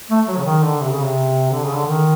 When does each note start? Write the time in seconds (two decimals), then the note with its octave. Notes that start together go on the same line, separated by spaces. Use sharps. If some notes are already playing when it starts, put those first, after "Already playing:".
0.11 A3
0.28 F#3
0.37 C#3
0.45 D#3
0.62 D3
0.81 C3
0.91 C#3
1.02 C3
1.51 D3
1.65 C#3
1.75 D3
1.87 D#3